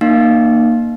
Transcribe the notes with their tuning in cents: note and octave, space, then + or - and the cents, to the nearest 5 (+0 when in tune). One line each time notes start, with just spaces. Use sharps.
A#3 +5 D#4 -35 F5 +0